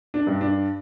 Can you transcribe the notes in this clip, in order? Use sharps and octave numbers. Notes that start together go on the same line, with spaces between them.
D4
G2
D4